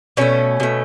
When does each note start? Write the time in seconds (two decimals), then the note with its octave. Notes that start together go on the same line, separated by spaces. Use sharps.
0.17 B2 A3 C#4
0.60 B2 A3